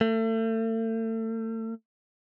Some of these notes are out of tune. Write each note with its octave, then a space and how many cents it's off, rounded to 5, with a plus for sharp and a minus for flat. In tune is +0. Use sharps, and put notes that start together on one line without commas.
A3 +35